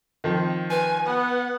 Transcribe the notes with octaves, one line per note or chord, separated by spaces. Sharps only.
D#3 F3 C4
B4 G#5
B3 F#5